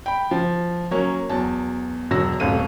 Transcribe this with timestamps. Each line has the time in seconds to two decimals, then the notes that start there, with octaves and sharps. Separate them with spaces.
0.06 G5 B5
0.31 F3
0.91 F#3 A#3 C#4
1.29 E2 F#3 A5
2.11 E1 D3 F#3 E6 A#6
2.40 D#1 G#1 D#2 A3 D#7